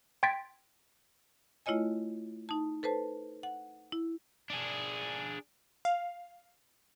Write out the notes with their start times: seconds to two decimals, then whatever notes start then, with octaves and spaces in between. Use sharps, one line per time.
0.23 G5 C6 G#6 A6 B6 D7
1.66 A3 E4 F4 C#5 D#5 G#5
2.49 D#4 A5
2.83 A4 B4 C5 A5
3.43 F#5
3.92 E4
4.50 D4 G#4
5.85 F5